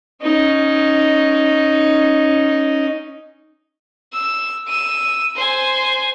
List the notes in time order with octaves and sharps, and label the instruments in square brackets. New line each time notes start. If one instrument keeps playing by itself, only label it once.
[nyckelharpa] C#4 D#4
[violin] E6
E6 D#7
C5 G#5